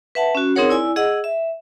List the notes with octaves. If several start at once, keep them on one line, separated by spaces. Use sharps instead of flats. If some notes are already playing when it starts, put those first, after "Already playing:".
B4 E5 F#5 A5
C#4 F#4
C4 D#4 G#4 A#4 C#5 F#5
E4 D5 G#5 E6
G#4 D#5 F#5 E6
E5